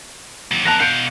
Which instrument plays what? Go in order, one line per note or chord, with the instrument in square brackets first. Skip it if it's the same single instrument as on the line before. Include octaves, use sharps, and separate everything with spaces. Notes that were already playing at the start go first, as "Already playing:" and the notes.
[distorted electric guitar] D#2 F#3
[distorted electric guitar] F2 A#4 [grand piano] A5 F#6 A#6
[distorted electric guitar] B2 F5 [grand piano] G6 C#7 D7